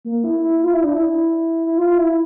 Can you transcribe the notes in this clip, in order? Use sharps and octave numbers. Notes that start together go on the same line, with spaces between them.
A#3
E4
E4
F4
E4
D4
E4
E4
F4
E4